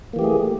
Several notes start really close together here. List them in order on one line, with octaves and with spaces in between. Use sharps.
A#3 E3 G4 A3 G#4